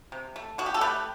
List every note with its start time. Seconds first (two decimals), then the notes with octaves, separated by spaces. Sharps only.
0.12 C3
0.36 A3
0.58 B2 F#4
0.66 G4
0.74 A4
0.81 A3 G4 B4